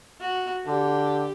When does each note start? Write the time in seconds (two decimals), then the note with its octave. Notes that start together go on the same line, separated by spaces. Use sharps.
0.20 F#4
0.67 D3 G4